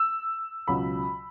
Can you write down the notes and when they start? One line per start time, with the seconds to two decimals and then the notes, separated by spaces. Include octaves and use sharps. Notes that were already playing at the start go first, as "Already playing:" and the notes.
Already playing: E6
0.68 C#2 B2 F#3 B5